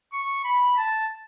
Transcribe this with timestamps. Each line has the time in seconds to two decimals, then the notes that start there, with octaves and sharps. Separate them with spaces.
0.13 C#6
0.44 B5
0.77 A5